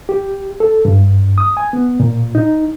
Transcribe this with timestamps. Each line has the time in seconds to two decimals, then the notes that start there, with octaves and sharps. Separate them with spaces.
0.09 G4
0.60 A4
0.85 G2
1.38 D#6
1.57 G#5
1.73 B3
2.00 A#2
2.35 D#4